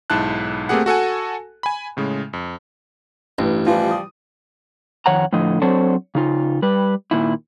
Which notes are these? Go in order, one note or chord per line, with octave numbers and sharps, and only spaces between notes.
B1 G#2 E4 A5 F#6
A3 A#3 C4 G4 G#4 F#5
F#4 A4 F#5 G#5
G#5 B5
A2 C#3 G#3
F2
A1 G2
E3 F3 G3 F4
D#6
F2 D#3 C#5 F#5 A#5
A2 D3 F3 D#5
F#3 C4 D4 A4 C5 C#5
C#3 D#4 F4
G3 B4
A#2 D#3 E4